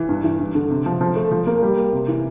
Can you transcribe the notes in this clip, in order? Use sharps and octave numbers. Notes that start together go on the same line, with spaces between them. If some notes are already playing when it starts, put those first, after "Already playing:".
Already playing: E3
G2
E3
G2
D3
C3
F3
F3
A3
F3
A#3
G3
A#3
C3
E3